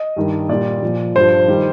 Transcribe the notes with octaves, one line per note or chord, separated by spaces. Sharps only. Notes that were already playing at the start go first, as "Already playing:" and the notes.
Already playing: D#5
G2 D#3 G3
A#2 G3 D5
A#2 F3
G2 F3 C5
D#3 G3